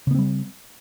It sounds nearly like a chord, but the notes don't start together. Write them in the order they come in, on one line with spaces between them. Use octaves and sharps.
C#3 B3 C4 G3